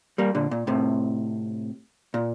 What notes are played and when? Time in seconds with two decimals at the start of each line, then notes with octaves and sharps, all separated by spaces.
0.18 G3 A#3
0.35 A#2 D3
0.51 A#2
0.67 A2 C3
2.14 A#2